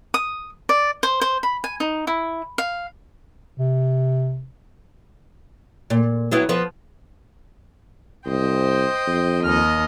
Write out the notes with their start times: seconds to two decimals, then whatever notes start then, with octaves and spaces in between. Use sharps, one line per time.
0.14 D#6
0.69 D5
1.03 C5
1.21 C5
1.43 B5
1.64 G#5
1.80 D#4
2.07 E4
2.58 F5
3.58 C3
5.90 A#2
6.31 F#3 B3 E4
6.49 F3 B3 B4
8.26 C2 C5 D#5 G5
9.07 F2
9.44 D#2 D#5 F6